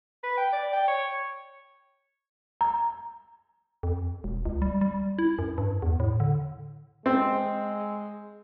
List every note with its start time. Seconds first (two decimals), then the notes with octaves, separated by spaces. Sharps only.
0.23 B4
0.37 G5
0.52 D5
0.73 G5
0.88 C#5
2.61 A#5
3.83 F2
4.24 E1
4.45 C#2
4.62 G3
4.81 G3
5.19 E4
5.39 F#2
5.58 G2
5.82 E2
6.00 A2
6.20 D3
7.06 G#3 C4